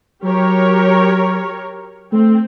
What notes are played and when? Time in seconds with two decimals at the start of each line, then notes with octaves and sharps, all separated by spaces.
0.24 F#3 G4 A#4 C#5
2.13 A3 C4